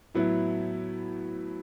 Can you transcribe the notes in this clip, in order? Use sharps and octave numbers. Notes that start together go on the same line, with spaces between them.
A2 F#3 B3 E4